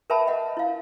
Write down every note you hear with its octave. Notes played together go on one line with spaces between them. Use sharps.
A#4 B4 E5 G5 A5 B5
D#5 F#5
E4 F5